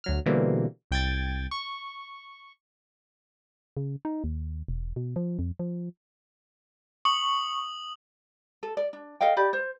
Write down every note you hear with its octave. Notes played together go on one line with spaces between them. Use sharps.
D2 F#3 F6
B2 D3 E3 G3 A#3 C4
C2 G5 G#6 A6
C#6
C#3
D#4
D#2
E1
B2
F3
F2
F3
C#6 D#6 F#7
A4
D5
D4
A4 D#5 F5 G5
G4 D5 B5
C5